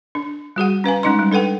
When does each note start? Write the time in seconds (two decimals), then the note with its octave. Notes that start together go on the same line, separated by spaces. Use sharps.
0.15 D4
0.56 G3 F#4 G#4 F#5
0.84 C#4 B4 F5 G#5
1.03 G#3 C#4 D#4 D#5 C6
1.19 G3
1.32 D4 A4 B4 F#5 G5